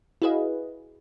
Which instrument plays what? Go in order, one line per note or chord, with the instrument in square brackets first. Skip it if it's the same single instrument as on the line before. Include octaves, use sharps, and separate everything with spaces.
[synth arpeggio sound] E4 F#4 G#4 B4 D#5 F5